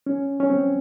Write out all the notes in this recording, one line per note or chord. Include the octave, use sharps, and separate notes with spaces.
C#4
C#4
C4